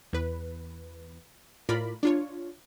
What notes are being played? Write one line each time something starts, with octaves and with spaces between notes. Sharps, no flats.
E2 B4
A2 F4 A#4 D5 B5
D4 F4 C#5